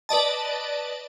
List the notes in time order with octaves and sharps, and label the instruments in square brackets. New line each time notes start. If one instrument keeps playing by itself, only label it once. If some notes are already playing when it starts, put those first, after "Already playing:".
[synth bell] B4 D5 D#5 A5